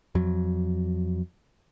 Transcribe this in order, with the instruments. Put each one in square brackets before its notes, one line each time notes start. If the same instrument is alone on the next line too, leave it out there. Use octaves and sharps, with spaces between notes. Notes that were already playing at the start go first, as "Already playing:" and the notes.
[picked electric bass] F2 F#3